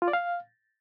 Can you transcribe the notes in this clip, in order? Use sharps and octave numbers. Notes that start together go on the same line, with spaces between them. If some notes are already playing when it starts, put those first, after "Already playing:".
F4
D5
F5